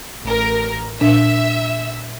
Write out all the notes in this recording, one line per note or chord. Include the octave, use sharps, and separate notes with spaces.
A1 A#4
A#2 D4 E5 E6